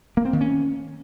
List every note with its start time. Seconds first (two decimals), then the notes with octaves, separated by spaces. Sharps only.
0.17 A#3
0.25 C4
0.33 D#3
0.41 C#4